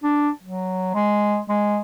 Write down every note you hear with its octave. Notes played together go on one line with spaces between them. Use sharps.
D4
F#3
G#3
G#3